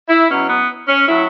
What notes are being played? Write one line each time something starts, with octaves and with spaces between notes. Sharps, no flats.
E4
B2 F#3 C#4
B3
C#4
A2 F#3 E4